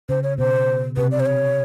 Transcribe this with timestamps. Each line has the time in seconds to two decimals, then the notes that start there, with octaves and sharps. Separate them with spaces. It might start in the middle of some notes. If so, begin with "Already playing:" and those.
0.09 C#3 C5
0.23 C#5
0.38 B2 C5
0.97 C3 B4
1.11 D5
1.20 C5
1.26 C#5